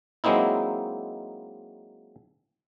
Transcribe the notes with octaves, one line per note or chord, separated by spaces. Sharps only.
F#3 G#3 A#3 C4 D#4 E4